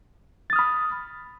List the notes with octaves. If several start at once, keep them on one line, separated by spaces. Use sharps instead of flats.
B5 D#6 F6 A6